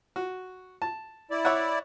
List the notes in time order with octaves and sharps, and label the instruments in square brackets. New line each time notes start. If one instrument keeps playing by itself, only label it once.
[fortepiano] F#4
A5
[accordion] E4 D5
[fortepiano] C#5 E5 F#5